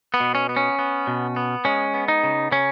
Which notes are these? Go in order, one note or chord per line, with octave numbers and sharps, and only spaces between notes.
B3
B2
C#4
B3
C#4
B3
B2
B3
G#3 C#4
B3
D#4
C#3
C#3 C#4